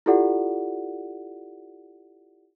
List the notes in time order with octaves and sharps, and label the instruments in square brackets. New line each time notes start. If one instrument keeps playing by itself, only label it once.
[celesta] E4 F4 G4 A4 D5 F#5